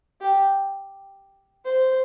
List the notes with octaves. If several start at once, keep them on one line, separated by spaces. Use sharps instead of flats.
G4
C5